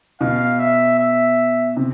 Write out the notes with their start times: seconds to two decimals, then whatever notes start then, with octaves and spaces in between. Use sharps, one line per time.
0.21 B2 F5
0.59 E5
0.99 E5
1.77 C3